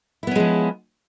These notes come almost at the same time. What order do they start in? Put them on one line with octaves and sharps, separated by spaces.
E4 B3 C#4 G#3 F3